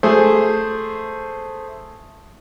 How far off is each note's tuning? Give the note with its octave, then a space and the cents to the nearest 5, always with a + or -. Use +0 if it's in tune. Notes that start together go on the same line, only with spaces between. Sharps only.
A3 +0 G#4 +0 C5 +0